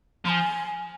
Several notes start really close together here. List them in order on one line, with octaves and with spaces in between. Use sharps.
F3 C6 G#5